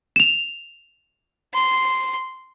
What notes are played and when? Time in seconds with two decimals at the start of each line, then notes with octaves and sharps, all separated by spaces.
0.16 E7 F7
1.54 C6